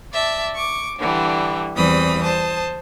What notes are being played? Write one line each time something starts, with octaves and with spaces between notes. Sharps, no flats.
D5 E5 A5
C#6 D6
D3 E3 G3
E2 E3 G3 C4 B5 D#6
C5 A5 D#6